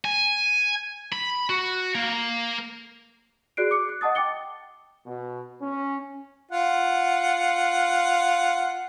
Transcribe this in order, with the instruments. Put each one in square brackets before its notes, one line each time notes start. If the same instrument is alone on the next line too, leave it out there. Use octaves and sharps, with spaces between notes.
[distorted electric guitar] G#5
B5
F#4
A#3
[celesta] F#4 G#4 D5 F#6 C7 D7
D6 C#7
F#6
D#5 F#5 A5 D#6 A6
G5 D6 A6 C#7 G7
[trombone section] B2
C#4
[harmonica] F4 F#5